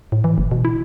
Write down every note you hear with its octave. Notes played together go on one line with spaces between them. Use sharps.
A2
E3
F#1
B2
E4